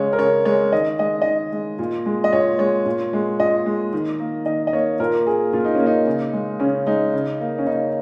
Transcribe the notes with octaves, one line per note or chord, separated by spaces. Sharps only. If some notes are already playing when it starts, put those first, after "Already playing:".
Already playing: C#3 G#3 C#5
A#4
C#3 C#5
G#3 C#5
D#3 D#5
G#3 D#5
D#3 D#5
G#3
A#2
G#3
D#5
A#2 C#5
G#3 C#5
A#2
G#3
A#2 D#5
G#3
D#3
A#3
D#3 D#5
D#5
A#3 C#5
A#2 A#4
A#3 G#4
A#2 F4
D#4
C#4
A#3
D#4
C#3
G#3
C#3 C#4
G#3 D#4
C#3
A#3
C#4
C#3 D#4